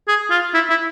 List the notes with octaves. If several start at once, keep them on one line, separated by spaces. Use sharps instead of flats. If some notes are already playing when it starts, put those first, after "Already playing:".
G#4
F4
E4
E4